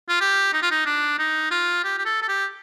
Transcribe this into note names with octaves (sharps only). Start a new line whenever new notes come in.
F4
G4
D#4
F4
D#4
D4
D#4
F4
G4
G4
A4
A4
G4